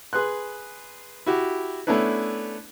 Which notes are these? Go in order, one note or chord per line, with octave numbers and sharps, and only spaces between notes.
G#4 B4 C6 F#6
E4 F#4 G4
A3 B3 C#4 D4 E4 B4